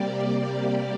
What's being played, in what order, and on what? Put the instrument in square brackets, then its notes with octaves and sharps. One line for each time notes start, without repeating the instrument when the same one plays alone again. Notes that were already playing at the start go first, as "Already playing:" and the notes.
Already playing: [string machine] C3 G3 A#3 G4 D5